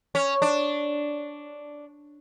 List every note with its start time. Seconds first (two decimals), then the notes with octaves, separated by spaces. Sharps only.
0.15 C#4
0.42 D4